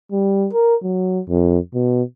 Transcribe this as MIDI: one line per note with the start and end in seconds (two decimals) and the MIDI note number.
0.12 0.48 55
0.53 0.75 70
0.83 1.20 54
1.29 1.59 41
1.74 2.03 47